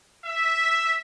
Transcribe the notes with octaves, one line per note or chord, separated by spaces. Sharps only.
E5